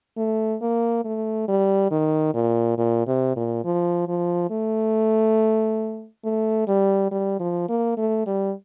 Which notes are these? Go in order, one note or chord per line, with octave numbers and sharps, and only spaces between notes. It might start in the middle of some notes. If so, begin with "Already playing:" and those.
A3
A#3
A3
G3
D#3
A#2
A#2
C3
A#2
F3
F3
A3
A3
G3
G3
F3
A#3
A3
G3